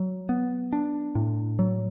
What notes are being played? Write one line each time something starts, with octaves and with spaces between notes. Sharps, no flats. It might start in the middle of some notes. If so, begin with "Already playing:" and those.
Already playing: F#3
B3
D4
A2
F#3